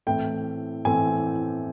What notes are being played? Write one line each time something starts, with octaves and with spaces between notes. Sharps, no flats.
A2 E3 A3 C4 G5
A2 E3 A3 C4 G#5